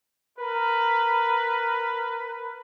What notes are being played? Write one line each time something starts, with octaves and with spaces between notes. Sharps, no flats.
A#4 B4